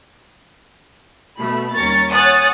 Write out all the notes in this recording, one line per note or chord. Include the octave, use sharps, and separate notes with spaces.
B2 A3 B5
D#2 G3 C#4 A#5 C#6 A6
C#5 F#5 G#5 D#6 F#6 A6